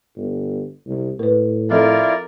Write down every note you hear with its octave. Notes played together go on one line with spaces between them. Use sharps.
G1
C2
A2 A#4 B4
F3 C4 E4 F4 A4 A#4 D5